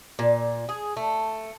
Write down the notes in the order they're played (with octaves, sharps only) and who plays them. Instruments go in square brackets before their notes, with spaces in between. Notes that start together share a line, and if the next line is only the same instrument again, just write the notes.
[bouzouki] A#2
G#4
A3